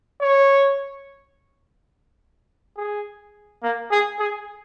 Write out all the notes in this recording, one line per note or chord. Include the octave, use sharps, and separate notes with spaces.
C#5
G#4
A#3
G#4
G#4